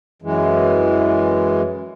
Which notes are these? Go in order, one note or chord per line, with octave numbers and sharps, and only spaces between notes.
F#2 E3 G#3